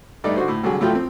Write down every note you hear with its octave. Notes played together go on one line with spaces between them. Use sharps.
G2 A3 D#4 A4 D5
D3 F#4 C5
A2
C2 D3 F#3 G#4
A2 F3 F#3 A3 F4 G5
F3 C4